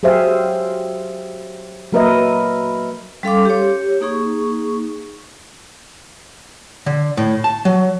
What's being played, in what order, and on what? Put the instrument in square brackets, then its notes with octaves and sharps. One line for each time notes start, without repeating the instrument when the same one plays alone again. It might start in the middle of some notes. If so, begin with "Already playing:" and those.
[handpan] F#3 G4 G#4 C5 E5 F5
F#3 A#3 A#4 B4 D#5 E5
[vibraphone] G3 C#4 A4 F5 C6 D6
G4 C#5
A#3 D#4 G#4 C#6
[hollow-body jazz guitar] D3
A2
A5
F#3